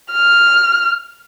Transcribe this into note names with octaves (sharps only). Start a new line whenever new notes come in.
F6